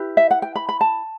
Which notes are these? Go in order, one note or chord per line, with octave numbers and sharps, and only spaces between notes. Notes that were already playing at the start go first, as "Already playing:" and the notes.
Already playing: E4 G4 B4
E5
F#5
G5
B5
B5
A5